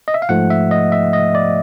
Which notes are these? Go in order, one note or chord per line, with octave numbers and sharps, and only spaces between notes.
D#5
E5
F5
G#2 F3 A3 F#5
E5
D#5
E5
D#5
D5